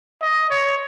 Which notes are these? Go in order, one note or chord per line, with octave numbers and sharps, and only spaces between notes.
D#5
C#5